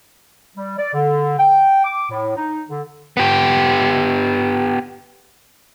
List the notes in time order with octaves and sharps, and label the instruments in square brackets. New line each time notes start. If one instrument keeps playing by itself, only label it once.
[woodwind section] G3
D5
D3
G5
D6
A2
D#4
D3
[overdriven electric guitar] B3 G4